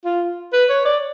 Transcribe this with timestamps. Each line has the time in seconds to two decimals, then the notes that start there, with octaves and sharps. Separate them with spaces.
0.05 F4
0.53 B4
0.69 C#5
0.85 D5